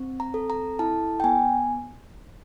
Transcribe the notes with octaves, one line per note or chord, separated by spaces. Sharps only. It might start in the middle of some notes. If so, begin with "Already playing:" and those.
Already playing: C4
A#5
A4
A#5
E4 A5
G5
B3 G#5